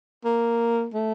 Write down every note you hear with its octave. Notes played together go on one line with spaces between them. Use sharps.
A#3
A3